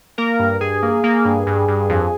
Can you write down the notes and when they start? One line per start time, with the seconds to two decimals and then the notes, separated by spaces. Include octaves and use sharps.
0.18 A#3 A#4
0.39 G2
0.61 G2 G#4
0.82 A#3
1.04 A#3
1.25 G2
1.47 G2
1.68 G2
1.89 F2